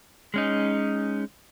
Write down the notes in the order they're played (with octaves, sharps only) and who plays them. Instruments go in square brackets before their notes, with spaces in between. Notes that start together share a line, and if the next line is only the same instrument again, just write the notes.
[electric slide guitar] G#3 C#4 D#4